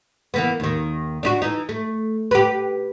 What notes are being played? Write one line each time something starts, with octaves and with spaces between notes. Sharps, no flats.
E3 A#3 B3
D#2 D#3
D4 D#4 F#4
E3 D#4
A3
G4 B4